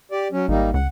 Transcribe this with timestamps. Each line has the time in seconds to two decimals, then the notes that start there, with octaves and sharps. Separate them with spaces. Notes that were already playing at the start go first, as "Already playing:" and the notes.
0.12 G4 D5
0.32 F#3 C#4
0.48 G#1 G3 A#3 D#4
0.74 C#2 F#5